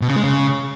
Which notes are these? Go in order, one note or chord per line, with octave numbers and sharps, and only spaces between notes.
B2
C#3
G#3
C#3